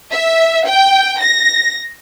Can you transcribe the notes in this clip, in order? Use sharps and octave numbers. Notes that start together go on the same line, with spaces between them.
E5
G5
A#6